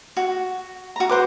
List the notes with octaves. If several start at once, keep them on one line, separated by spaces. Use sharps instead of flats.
F#4
F#4 A#5
F#4 B4 C5 D6